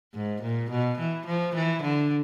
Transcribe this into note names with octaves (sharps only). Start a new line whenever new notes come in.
G#2
A#2
B2
E3
F3
E3
D3